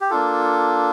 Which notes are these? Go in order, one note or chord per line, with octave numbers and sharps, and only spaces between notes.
G4
A#3 D4 F4 A4